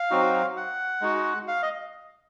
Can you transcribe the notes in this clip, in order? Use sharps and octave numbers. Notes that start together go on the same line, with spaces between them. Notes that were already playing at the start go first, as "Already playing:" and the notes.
Already playing: F5
F#3 C4 D#4 F#4
F#5
G#3 D#4 F#4
F5
D#5